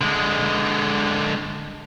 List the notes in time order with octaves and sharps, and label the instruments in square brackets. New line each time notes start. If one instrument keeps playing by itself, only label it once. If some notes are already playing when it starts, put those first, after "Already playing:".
[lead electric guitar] D3 G#3